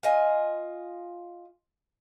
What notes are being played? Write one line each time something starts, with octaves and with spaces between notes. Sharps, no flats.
F4 D#5 G#5